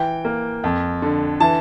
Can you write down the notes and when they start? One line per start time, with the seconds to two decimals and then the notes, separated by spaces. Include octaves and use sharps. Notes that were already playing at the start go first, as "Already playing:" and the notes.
Already playing: E3 G5
0.25 A#3
0.64 F2
1.02 D3
1.40 E3 A5